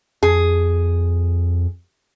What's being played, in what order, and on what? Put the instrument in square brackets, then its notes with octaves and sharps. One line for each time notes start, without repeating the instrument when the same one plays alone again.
[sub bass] F2 [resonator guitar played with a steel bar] G#4